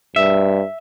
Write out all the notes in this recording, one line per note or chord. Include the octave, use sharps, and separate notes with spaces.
G2 E5